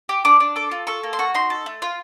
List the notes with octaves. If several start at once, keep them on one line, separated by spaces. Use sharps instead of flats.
G4
D4 D6
D4
A4 D6
F4
A4 C#6
A#3
C6
F#4 C#6
D#4 C6
A4
A3
F4